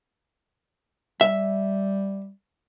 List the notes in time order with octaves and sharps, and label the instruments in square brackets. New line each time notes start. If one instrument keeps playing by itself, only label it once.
[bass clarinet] G3 [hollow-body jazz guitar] E5